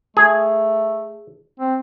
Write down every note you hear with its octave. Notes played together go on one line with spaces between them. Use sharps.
A3 G#4
C4